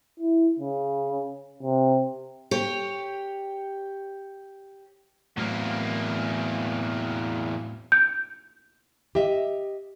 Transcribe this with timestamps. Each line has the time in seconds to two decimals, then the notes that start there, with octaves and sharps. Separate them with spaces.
0.20 E4
0.59 C#3
1.63 C3
2.51 G4 C#5
5.37 E2 A2 F#3 A#3 C4
7.92 G6
9.15 G4 D#5 E5